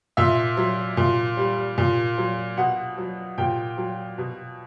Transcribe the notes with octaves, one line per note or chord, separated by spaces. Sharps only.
A#2 E5
F#3
A#2
G3
A#2
F#3
B2 F#5
F#3
A#2 G5
F#3
B2